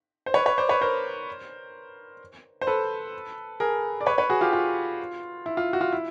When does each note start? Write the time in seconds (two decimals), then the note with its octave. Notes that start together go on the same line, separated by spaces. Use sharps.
0.26 C5
0.34 B4 C#5
0.46 B4 C#5
0.58 C5 D5
0.69 B4 C#5
0.81 A#4 C5
2.61 C5
2.67 A4 B4
3.60 G#4 A#4
4.01 D5
4.06 B4 C#5
4.18 B4 C#5
4.30 F#4 G#4
4.41 F4 G4
4.53 F4
5.46 E4
5.57 F4
5.73 F#4
5.81 F4
5.92 E4